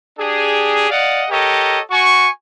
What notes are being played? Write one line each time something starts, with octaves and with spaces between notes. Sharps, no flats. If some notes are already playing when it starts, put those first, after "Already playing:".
D4 G4 G#4
D5 D#5 F5 F#5
G4 A4 A#4 C#5 D#5
F#4 G#5 C#6